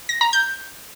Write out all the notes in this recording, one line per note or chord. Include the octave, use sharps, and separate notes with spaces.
A#6
A#5
G6